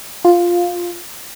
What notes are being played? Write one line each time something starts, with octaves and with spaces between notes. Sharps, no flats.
F4